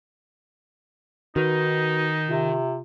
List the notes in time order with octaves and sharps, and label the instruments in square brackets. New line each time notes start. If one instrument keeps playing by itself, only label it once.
[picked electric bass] D#3 [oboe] D#4 [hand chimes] F#4 B4
[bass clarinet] C3 [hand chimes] F4